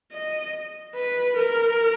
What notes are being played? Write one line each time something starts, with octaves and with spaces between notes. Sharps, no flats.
D#5
B4
A#4